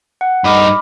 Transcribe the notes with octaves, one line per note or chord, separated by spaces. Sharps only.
F#5
G2 D#4 B5 D6 F6